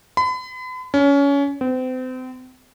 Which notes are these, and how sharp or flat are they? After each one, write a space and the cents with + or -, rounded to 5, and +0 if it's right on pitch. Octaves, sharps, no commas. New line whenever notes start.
B5 +40
C#4 +25
C4 -35